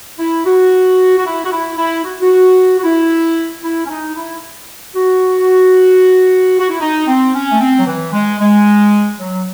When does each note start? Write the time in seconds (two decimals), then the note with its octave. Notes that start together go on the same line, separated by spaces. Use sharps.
0.19 E4
0.46 F#4
1.18 F#4
1.25 E4
1.44 F#4
1.51 E4
1.78 E4
2.04 F#4
2.21 F#4
2.79 F#4
2.84 E4
3.63 E4
3.85 C#4
3.89 D#4
4.16 E4
4.96 F#4
6.59 F#4
6.70 E4
6.81 D#4
7.07 C4
7.34 C#4
7.52 A3
7.60 C4
7.79 F#3
7.87 E3
8.13 G#3
8.40 G#3
9.19 F#3